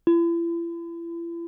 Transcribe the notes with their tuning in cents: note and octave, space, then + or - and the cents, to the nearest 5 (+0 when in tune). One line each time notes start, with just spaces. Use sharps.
E4 +40